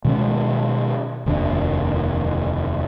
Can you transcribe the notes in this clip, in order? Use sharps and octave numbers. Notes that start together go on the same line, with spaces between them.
B2 D#3 G#3 C#4
F1 D#2 D4